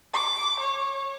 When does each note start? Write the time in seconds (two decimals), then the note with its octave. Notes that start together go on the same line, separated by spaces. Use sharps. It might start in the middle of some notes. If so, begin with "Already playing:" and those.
0.14 D6
0.60 C#5